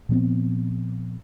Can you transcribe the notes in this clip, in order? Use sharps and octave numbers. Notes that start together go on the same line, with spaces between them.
A#2 F3 B3 C4